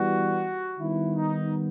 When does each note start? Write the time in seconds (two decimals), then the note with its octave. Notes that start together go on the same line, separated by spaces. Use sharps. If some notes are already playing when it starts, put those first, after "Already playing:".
Already playing: E3 G3 B3 F#4
0.79 D#3 G3 B3 E4
1.16 D#4